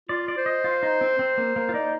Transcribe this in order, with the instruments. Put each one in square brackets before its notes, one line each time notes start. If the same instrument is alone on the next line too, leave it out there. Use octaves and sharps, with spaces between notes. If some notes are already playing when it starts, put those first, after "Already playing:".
[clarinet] F4 [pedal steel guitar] D5
[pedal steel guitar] D5
[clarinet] C5
[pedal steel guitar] D#5
F4
D#4
C4
C4
A#3
A#3
F4
[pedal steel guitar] D#4 [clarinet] D5